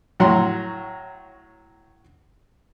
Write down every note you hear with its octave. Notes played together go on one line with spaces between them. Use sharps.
A2 F#3 F#5 A#5 C6